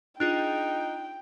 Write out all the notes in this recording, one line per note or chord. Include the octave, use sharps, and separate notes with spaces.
D4 D#4 F4 G#4 G5 F#6